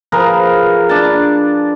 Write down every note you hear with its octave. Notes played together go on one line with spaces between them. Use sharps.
F3 G#4 A#4 B4
D4 A5